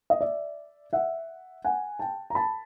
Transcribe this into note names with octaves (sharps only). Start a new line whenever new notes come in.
D#5
D5 E5
E5 F#5
F#5 G#5
G5 A5
A#5
A5 B5